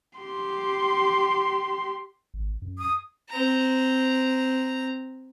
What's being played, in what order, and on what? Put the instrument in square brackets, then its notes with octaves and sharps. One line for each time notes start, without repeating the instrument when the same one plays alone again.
[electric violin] G4 C6
[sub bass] G#1
F#2
[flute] D#6
[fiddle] C4 A#5